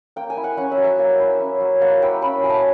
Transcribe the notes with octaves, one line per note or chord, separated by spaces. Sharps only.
A#3 G5
G#5
E4
F#5
C#4 F#5
E5
F#3
E5
A#3
E4
C#4
F#3
A#3 F#5
E4 G5
C#4 B5
F#3 G#5
A5